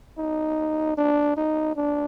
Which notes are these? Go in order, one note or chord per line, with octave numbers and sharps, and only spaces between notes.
D#4
D4
D#4
D4